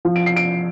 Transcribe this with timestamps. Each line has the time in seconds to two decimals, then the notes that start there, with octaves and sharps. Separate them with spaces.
0.05 F3
0.16 D7
0.26 C7
0.36 D7